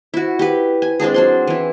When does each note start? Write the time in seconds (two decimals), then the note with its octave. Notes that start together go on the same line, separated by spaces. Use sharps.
0.14 E4 F#4
0.39 G4 B4
0.82 G#5
1.00 G#3 C4 D4 G#4
1.14 F#3 D4 C6
1.47 E3 E4